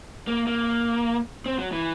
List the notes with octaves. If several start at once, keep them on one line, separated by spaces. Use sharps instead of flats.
A#3
A#3
C4
F#3
E3